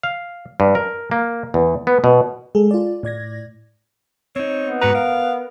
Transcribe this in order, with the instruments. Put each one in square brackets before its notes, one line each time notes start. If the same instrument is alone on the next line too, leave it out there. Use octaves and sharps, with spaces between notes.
[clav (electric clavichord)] F5
G2
A#4
A#3
E2
B3
B2
[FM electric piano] G#3 G#4 A4
F4 D5
A2 D5 G#6 A#6
[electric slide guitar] C4 D#4 [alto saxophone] C#5
[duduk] B3
[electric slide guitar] G#2 F#4 A#5 [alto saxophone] B4
[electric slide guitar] A#4 [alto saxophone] F5